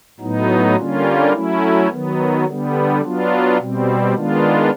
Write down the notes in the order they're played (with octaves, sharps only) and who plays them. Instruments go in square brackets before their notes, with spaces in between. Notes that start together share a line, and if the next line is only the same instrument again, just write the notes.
[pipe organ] A2 F#3 B3 D#4
D3 G3 A#3 C#4 F4
F#3 A3 C#4 E4
D#3 F#3 B3
D3 G3 B3
F#3 B3 D4 F4
B2 G3 C4
D#3 G#3 B3 D4 F4